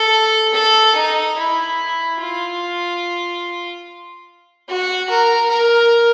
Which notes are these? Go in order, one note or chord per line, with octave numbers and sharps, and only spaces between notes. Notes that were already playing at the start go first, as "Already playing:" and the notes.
Already playing: A4
A4
D#4
E4
F4
F#4
A#4
A#4